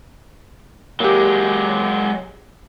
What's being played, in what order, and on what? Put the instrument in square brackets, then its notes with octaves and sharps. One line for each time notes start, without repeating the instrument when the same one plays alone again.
[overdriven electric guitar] F#3 G#3 [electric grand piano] A#3 G4